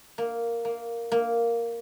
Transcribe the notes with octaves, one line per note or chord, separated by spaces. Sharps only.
A#3
A#3
A#3